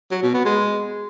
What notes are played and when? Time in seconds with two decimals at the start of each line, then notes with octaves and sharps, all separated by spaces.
0.11 F#3
0.22 B2
0.34 B3
0.45 G#3